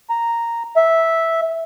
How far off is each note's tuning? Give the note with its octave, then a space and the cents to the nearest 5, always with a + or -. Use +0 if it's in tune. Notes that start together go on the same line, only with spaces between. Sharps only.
A#5 -5
E5 -5